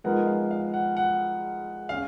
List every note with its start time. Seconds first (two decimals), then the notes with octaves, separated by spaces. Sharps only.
0.04 F3 G#3 B3 D#4 A#4 F#5
0.27 F5
0.51 F5
0.74 F#5
0.97 F#5
1.89 C#4 G#4 F5